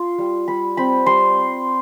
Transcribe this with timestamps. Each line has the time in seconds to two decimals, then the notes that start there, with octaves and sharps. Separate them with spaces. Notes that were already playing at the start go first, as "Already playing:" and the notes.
Already playing: F4 C6
0.18 G3
0.48 G3 B5
0.77 C4 B5
1.06 G3 C6